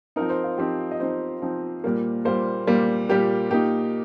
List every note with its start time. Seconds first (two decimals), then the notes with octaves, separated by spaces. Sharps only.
0.16 F3 C4 D#4 A#4
0.30 C5
0.44 F4
0.58 F3 C4 D#4 G4
0.91 D#5
1.00 F3 C4 D#4 C5
1.42 F3 C4 D#4
1.84 A#2 G3 A#3
2.25 A#2 G3 A#3 C5
2.67 A#2 G3 A#3
3.09 A#2 G3 A#3 G4
3.51 A#2 A#3 D#4 G4